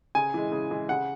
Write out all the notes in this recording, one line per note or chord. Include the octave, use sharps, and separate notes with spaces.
C#3 G#5
E3 G#3
C#3
E3 G#3
C#3 F#5